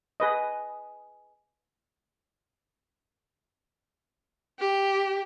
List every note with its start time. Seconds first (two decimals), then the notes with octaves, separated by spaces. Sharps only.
0.20 G#4 B4 D#5
4.59 G4